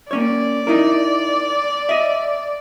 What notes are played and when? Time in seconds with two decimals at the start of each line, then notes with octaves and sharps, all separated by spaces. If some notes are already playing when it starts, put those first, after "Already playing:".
0.11 A#3 C#4 C#5 D5
0.67 D#4 E4 A#4
1.89 D#5 E5